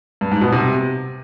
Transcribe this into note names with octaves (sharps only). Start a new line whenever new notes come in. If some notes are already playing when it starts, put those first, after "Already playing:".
G2
G#2
B2
C3